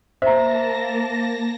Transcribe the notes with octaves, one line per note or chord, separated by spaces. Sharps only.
A#3 C5 E5 A5 A#5 A#6